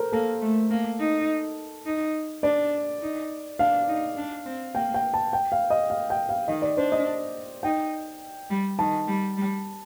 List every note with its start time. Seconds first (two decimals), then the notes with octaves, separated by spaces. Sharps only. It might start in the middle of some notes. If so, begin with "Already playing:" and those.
Already playing: A4 A#4 C5
0.12 A#3 A4
0.42 A3
0.70 A#3
0.99 D#4
1.86 D#4
2.43 D4 D5
3.02 D#4
3.59 D4 F5
3.88 D#4
4.17 D4
4.45 C4
4.75 A#3 G5
4.94 G5
5.14 A5
5.33 G5
5.52 F5
5.70 D#5
5.90 F5
6.10 G5
6.29 F5
6.48 D#3 D#5
6.62 D5
6.77 D4 C5
6.92 D#5
7.63 D#4 G5
8.50 G3
8.79 D#3 A5
9.08 G3
9.37 G3